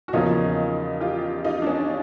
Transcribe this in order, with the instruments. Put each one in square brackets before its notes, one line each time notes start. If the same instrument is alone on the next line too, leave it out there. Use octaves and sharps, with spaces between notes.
[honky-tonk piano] F#4
[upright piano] E2 C#3 F3 A#3 C#4 [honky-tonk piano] D#4 F4
[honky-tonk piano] F4 G4
D#4 F4
D4
C#4 D#4